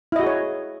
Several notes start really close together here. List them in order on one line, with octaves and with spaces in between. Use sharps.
E4 D#5 F#4 G#4 C#5